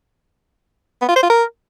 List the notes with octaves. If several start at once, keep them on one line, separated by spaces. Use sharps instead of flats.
B3
F4
C5
F4
A#4